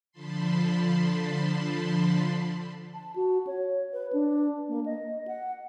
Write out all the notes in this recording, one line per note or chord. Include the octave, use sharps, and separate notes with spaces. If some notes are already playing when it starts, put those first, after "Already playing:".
D3 F3 A5 B5 C6
A5
F#4
C#5
B4
D4
A#3
D#5
F#5